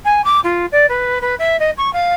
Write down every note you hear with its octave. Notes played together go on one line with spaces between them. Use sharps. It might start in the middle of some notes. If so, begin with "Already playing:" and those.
G#5
D6
F4
D5
B4
B4
E5
D#5
C#6
F5